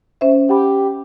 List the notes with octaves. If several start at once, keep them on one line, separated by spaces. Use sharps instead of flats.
C#4 C5 E5
G4 F#5 B5